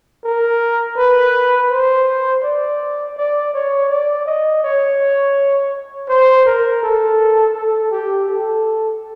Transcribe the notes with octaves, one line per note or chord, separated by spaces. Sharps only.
A#4
B4
C5
D5
D5
C#5
D5
D#5
C#5
C5
A#4
A4
A4
G4
A4